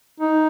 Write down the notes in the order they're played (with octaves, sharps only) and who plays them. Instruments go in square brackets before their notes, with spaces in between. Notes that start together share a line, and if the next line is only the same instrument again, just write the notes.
[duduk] D#4